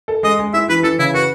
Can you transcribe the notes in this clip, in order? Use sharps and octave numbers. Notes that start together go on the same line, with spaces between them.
A4
G#3 D#5
G#3
E4 E5
E3 B4
E3 A4
C#3 E4
F#4 B4